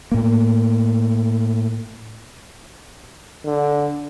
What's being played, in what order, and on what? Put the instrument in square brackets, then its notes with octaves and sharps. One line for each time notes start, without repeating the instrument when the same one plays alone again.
[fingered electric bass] A2 A#3
[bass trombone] D3